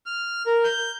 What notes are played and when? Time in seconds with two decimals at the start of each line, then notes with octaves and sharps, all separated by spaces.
0.06 F6
0.46 A#4
0.64 G6